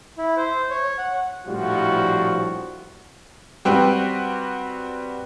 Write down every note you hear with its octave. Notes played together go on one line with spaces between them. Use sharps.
E4
C5
C#5
F#5
A#1 A2 F3 G3 F#4
G3 C4 F#4 B4 G5